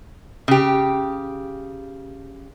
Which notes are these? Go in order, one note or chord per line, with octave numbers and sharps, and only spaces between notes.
C#3 G4